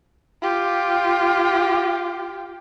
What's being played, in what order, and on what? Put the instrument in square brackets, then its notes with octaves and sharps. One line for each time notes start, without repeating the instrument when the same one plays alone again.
[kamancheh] F4 G4